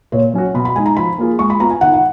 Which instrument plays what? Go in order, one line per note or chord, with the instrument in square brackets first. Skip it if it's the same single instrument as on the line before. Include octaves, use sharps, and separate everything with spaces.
[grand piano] A#2 [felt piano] C#5
[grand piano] F#3 C#4 F#4
[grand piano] B2 [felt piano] B5
[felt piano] B5
[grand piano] G#3 D#4 [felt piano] G#5
[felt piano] A#5
[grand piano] F3 [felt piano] B5
[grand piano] A#3 F4 G#4
[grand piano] G#3 [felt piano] C#6
[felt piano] B5
[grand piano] B3 F4 [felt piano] A#5
[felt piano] G#5
[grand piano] D#3 [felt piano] F#5
[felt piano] F#5